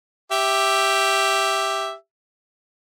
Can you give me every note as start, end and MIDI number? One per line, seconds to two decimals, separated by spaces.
0.32 1.93 67
0.32 1.93 76